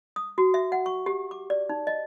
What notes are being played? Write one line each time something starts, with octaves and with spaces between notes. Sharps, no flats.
D#6
F#4
E5
F#5
C#6
G4
D6
D5
D#4
D#5